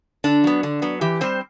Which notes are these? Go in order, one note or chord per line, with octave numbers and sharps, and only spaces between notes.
D3 D4
F#3 B3
D3
F#3 B3
E3 G4
G3 C4 C5